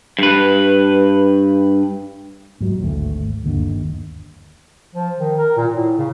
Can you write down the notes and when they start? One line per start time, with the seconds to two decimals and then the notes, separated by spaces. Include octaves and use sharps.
0.19 G2 B4
2.61 G#2 F#3
2.81 G#1 D2 D3 A3
3.44 G1 D#2 D3
4.95 F3
5.19 D#3
5.38 A#4
5.57 A#2
5.72 A2
5.98 C#3